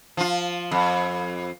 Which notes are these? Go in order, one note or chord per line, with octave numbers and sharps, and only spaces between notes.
F3 F4
F2